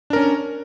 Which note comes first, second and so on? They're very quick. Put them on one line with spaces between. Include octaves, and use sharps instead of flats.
D4 A#4 C#4